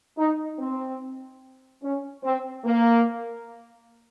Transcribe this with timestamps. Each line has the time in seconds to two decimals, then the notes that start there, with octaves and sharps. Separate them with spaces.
0.18 D#4
0.59 C4
1.82 C#4
2.24 C4
2.65 A#3